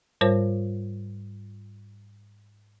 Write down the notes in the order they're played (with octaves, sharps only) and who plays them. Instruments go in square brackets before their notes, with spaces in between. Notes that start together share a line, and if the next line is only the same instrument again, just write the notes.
[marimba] G#2 G3 F4 A#4 C5 C#5